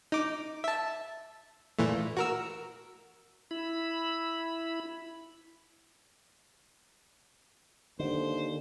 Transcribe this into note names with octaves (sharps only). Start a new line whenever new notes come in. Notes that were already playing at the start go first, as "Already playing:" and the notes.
D#4 D6
E5 A5
A#2 E3 A3
F#4 A#4 E6
E4 B5
D#2 D3 C5